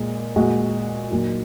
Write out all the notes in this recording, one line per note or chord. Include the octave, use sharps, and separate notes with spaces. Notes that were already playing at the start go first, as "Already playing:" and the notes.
Already playing: A#2 G#3
A#2 G#3 F#4
A#2 F#3 D#4